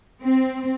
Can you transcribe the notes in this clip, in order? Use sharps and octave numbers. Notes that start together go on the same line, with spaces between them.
C4